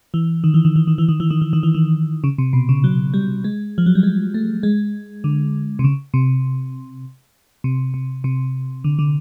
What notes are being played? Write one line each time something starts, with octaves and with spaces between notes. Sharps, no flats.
E3
D#3
E3
D#3
E3
D#3
E3
D#3
E3
D#3
E3
D#3
E3
D#3
C#3
C3
B2
C#3
F#3
G3
G#3
F3
F#3
G3
G#3
A3
G#3
D3
C3
C#3
C3
C3
C3
C3
D3
D3